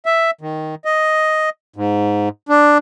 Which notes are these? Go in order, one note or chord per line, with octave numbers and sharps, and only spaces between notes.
E5
D#3
D#5
G#2
D4